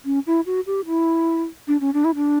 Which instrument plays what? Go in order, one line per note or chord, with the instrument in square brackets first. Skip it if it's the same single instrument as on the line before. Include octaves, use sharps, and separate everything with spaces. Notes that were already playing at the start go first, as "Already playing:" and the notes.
[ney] C#4
E4
F#4
G4
E4
D4
C#4
D4
E4
D4